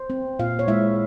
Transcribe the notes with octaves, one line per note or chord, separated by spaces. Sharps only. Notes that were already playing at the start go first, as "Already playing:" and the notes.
Already playing: C5
C4
A#2 F4 F5
C#5
G#3 E4 E5